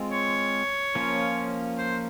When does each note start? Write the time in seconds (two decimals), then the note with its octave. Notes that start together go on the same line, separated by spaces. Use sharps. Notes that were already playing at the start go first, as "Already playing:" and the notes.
Already playing: G#3 C4 F4
0.12 C#5
0.95 F3 A#3 C#4 F4
1.78 C5